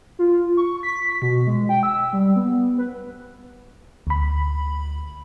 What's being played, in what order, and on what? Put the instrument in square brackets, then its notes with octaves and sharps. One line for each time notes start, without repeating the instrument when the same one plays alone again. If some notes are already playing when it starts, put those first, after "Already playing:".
[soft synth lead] F4
C#6
B6
B2
G#3
G5
E6
G3
B3
B4
[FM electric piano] D2 B5